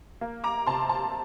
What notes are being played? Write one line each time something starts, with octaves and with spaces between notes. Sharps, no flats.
A#3
A#5 D6
C3 A5 C6
A5 C6